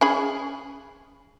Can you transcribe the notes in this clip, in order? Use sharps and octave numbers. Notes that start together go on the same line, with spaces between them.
C#4 G#4 B5